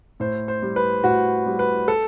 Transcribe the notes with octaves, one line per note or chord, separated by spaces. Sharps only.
A2 C5
C5
G3
B4
A2 F#4
G3
B4
A4